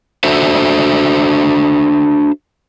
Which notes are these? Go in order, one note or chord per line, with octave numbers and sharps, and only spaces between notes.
D4 F#4 A4 C5 E5